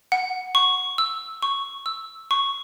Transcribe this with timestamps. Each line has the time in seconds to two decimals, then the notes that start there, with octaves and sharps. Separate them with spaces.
0.12 F#5
0.55 C#6
0.98 E6
1.42 C#6
1.86 E6
2.31 C#6